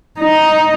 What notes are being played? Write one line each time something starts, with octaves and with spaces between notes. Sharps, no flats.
D#4